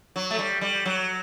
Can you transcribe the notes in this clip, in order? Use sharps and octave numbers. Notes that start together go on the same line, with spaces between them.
F#3
A3
G3
G3
F#3